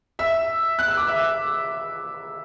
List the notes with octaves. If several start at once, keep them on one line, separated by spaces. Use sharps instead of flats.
E5 E6
F#6
E6
D6
E5 E6